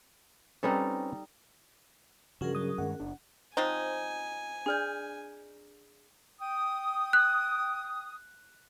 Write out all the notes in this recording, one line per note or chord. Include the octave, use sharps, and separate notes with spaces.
G3 C4 C#4 D#4 A4 B4
G2 C#3 F3 C#4 F#4 G#4 A#4
F#3 D#6
G2 D#3 G#3 F#5
F#1 D4
F3 C4 D#4 C5 G#5
D4 G#4 D5 F6 G6
G5 D#6
F#6